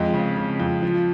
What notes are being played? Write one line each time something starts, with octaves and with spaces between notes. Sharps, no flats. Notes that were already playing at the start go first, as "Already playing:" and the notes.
Already playing: F2 G#3 D#5
C#3
C#3
F2
F3